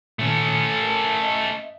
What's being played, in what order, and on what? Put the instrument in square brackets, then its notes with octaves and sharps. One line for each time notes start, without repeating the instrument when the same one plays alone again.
[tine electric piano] A#2 D#3 [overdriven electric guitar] A3 C#4
[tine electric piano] A#4
D#5 E5